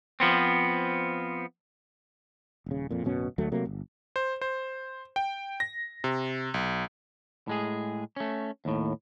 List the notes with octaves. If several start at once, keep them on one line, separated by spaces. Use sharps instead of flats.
F3 B3 C4
D#1 C#3
F2 A#2
D1 F#2 B2 C#4
D2 F#3 A3
C3 F#3 A3 A#3
G1
C5
C5
G5
A#6
C3
B1
A2 G#3 G#4
A3 C#4
D#2 A2